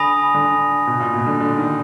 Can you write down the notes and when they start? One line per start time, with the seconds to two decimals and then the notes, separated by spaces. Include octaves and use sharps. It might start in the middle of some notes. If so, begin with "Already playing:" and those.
Already playing: D3 G#5 B5 D#6 A#6 F7
0.34 D3
0.87 B2
1.00 A#2
1.14 B2
1.27 D3
1.40 D3
1.58 D#3